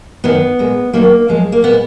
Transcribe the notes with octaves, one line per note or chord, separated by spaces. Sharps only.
F#2 D#3 F#3 B3
A#2 G#3
D#2 D#3 F#3 A#3
F#2 F3 G#3
A#3
A#2 G#3 B3